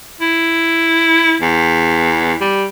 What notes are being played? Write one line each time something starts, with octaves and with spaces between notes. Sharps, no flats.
E4
E2
G3